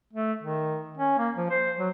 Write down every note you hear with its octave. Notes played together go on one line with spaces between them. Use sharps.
A3
D#3
C#4
A#3
F3
C5
F#3